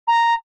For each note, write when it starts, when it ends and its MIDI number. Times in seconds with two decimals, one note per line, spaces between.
0.07 0.34 82